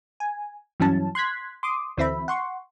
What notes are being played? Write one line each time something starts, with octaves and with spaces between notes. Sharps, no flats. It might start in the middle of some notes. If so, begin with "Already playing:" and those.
G#5
G2 E3 F#3 C#4 A5
C6 F#6 G#6 B6
C6 D6 D#6
D2 E3 C4 E5 B5
F#5 C6 C#6